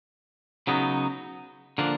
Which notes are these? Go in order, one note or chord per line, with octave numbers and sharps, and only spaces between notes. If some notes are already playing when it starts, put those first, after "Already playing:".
C#3 F#3 B3 D#4
D3 F3 A#3 D4